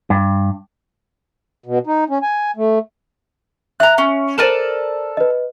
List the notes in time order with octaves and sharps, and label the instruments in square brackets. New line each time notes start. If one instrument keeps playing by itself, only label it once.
[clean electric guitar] G2
[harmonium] B2
D#4
C#4
G#5
A3
[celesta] E5 [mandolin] A#5 F#6
[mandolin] C#4
[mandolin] A4 A#4 D5 [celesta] C5 D#7 E7
[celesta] B4 D#5